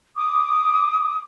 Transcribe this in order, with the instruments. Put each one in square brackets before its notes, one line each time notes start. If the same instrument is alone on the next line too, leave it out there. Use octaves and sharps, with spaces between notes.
[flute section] D6 D#6